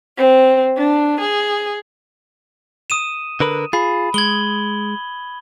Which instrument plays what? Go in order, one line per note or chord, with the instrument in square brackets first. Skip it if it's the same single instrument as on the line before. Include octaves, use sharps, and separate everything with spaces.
[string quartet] C4
D4
G#4
[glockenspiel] D#6 D#7 E7
[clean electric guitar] D3 A#4 B4
[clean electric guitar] F4 G#4 [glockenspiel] B5
[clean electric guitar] G#3 [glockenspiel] G#6 F#7 G7